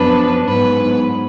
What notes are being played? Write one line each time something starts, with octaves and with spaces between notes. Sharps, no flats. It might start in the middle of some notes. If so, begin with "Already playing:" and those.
Already playing: F#2 F3 B3 D4 B4
G#2 F#3 B3 B4